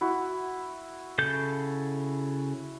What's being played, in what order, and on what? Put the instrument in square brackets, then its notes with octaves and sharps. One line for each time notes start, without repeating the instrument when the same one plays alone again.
[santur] E4 F#4
[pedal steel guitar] C#3 A4 G6